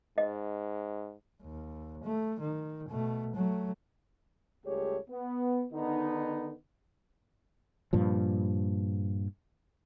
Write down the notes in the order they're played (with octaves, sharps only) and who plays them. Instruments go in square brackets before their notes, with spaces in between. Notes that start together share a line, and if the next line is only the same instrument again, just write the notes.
[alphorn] G#2 [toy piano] D#5
[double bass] D#2
A3
D#3
B2 A3
F#3 A3
[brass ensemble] C#2 G3 A3 G4 G#4 C#5
B3
D3 D#3 B3 D#4
[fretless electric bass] G2 A#2 F3